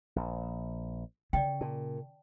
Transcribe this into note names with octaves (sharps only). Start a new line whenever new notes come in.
A#1
C#3 D5 D#5 G5
A#2 A5